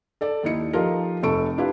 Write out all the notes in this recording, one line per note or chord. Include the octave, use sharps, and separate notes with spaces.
A4 D5 A5
D#2 D#3 D#4 E4 C#7
F3 D#4 F4 G4 A4 A#4
F1 C3 A4 C#6 D7
D4 E4 F4 G4 B4 F5